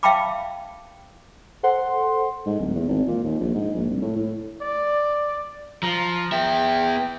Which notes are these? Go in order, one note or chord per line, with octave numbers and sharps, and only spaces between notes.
E5 F5 G5 A5 B5 D6
A4 C5 F#5 C6
G#2
D1
E2
G#1
A#2
D#2
A#1
G#2
A#1
C2
A2
A2
D5
F3 A#5
B3 E5 G5